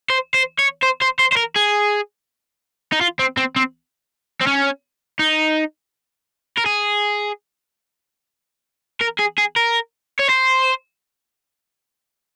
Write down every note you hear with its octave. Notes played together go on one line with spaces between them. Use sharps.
C5
C5
C#5
C5
C5
C5
C5
A#4
G#4
D#4
F4
C4
C4
C4
C4
C#4
D#4
A#4
G#4
A#4
G#4
G#4
A#4
C#5
C5